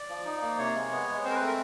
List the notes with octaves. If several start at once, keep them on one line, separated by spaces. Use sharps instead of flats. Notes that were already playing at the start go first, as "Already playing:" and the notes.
Already playing: D5
F3
D#4
A#3
C3 C#5
G#3
B3
G#3
C4 C5
A#4
B4
A3
A#4